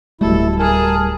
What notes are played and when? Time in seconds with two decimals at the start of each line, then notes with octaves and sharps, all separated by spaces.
0.21 D1 B2 G3 A3 E4 A4
0.59 G#4 A#4 G#5 A5